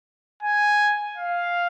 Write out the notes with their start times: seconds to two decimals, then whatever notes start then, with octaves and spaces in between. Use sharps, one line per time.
0.43 G#5
1.17 F5